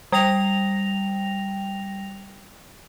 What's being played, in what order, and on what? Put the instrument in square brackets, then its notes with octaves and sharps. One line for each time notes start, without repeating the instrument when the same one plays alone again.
[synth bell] G3 G5 A#6 F7